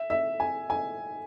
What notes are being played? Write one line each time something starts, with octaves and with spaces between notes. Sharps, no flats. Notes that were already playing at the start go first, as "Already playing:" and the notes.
Already playing: E5
E5
G#5
G#5